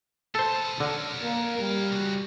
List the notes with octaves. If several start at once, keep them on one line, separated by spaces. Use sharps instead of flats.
B3 A4 C5 A5
D3 A#4 C#5
A#3
G3
C#2 F#4